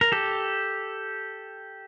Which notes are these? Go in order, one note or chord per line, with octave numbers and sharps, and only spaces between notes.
A#4
G4 A4